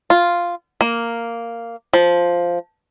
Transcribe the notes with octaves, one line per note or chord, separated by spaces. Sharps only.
F4
A#3
F3